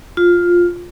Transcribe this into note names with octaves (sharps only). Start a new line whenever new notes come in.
F4